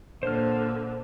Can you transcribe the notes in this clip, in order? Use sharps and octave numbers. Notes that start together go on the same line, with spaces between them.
A#2 D3 C5 F6